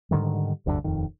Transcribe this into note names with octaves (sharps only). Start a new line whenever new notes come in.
G#2 D3 D#3 G3
F1 D2 G2 D3
D#1 F2 D#3